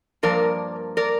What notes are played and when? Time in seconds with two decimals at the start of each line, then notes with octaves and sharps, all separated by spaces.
0.23 G2 F3 A#3 A#4 D5
0.97 A#4 D5